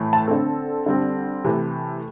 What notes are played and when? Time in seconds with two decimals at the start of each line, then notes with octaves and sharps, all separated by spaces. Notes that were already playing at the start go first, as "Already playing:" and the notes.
Already playing: A2 E3 A3
0.13 A5
0.27 D3 C4 A4
0.86 D3 G3 C4
1.44 C3 E3 A3